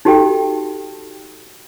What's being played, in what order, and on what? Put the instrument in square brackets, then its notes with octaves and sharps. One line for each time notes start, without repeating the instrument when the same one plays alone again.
[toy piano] D#4 F#4 G4 A4 G5